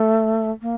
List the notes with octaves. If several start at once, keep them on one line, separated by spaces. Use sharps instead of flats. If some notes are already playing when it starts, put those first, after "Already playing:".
Already playing: A3
A#3